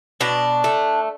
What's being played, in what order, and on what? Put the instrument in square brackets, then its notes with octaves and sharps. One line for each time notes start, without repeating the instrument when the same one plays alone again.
[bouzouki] B2 D4
A3